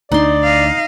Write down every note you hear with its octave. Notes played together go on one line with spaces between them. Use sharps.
D2 B3 D4 D#4 D5 C6
D#5 F5